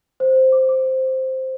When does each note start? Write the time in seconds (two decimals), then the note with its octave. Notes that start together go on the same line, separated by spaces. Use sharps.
0.20 C5
0.36 C5
0.52 D6
0.69 D6
0.86 C5